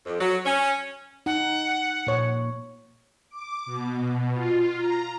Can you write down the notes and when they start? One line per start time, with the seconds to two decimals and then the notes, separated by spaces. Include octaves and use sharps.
0.06 F2
0.21 F#3
0.45 C#4
1.26 D#4 F#5
2.07 A#2 C#5
3.29 D6
3.66 B2
4.33 F4
4.77 A#5